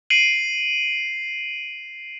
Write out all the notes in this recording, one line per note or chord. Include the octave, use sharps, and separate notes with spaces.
C7 D7 D#7 F#7